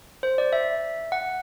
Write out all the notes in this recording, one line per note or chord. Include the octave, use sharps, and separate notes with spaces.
C5
D5
E5
F#5